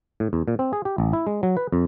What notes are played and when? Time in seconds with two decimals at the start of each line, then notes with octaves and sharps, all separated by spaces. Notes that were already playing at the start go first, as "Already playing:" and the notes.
0.20 A2
0.33 E2
0.48 A#2
0.59 C4
0.73 G#4
0.85 G4
0.98 A1
1.13 E4
1.27 G#3
1.43 F#3
1.57 B4
1.73 F2